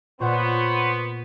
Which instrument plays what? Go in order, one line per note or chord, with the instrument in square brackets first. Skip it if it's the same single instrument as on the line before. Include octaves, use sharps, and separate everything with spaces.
[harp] A#2 F#5 [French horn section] B3 [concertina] C5 C#5